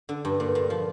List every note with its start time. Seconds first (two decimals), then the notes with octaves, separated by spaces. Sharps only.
0.09 D3
0.25 G2
0.40 A#2
0.55 A#2
0.70 F3